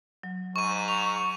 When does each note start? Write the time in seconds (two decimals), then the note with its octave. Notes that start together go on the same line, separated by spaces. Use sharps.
0.23 F#3
0.56 G#2 C#6 D#7
0.88 C#6 F7